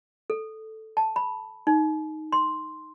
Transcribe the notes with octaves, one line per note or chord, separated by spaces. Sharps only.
A4
A5
B5
D#4
C6